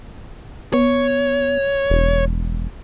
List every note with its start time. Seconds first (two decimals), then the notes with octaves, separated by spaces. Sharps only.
0.73 B3 C#5
1.90 E1